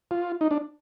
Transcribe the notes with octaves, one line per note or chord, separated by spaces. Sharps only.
F4
D#4
D4